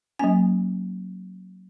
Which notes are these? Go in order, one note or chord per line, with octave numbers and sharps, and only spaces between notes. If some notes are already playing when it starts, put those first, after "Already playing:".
F#3 A#3 C#4 G#5